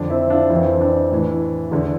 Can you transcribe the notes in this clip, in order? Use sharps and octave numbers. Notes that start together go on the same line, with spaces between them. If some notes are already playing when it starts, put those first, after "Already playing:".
Already playing: F2 D3 D4
C4 E4
D4 F4
F2 E3 C4
D4
A2 E3
E2 D3